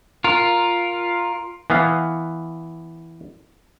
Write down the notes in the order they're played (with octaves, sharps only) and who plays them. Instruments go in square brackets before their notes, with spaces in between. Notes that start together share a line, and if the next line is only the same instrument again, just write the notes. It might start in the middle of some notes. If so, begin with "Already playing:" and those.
[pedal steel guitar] F4 A#4
[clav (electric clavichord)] E3 B3 F5